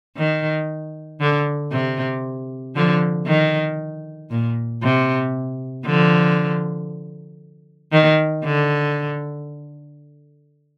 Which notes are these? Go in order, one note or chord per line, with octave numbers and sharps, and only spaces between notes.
D#3
D3
C3
D3 F3
D#3
A#2
C3
D3 F3
D#3
D3